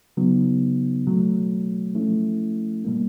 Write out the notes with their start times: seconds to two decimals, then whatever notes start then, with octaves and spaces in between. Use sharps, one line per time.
0.17 C#3 F#3 B3 D#4
1.07 B2 F#3 A3
1.95 F3 A3 C#4 E4
2.85 B2 G3 A#3